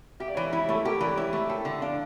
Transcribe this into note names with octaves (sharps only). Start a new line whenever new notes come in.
G4 E5
D5
E3 C#5 E5
E4
A3 A4
G4 A#4
E3 A#4 D5
E4 C#5 E5
A3
A4 E5 G5
D3
D4 D5 F5